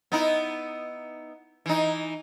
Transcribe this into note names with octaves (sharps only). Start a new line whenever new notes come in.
B3 D#4 E4
E3 D#4